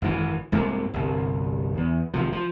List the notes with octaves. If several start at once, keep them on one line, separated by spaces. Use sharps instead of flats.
G#1 F#2 A2 E3
C2 G#2 C3 A#3
G1 C2
E2
G#1 C3 F3
F3